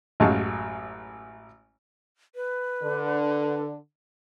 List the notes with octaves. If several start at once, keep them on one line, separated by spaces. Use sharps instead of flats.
A1 F#2 G#3 F5 A5 C#6
B4
D3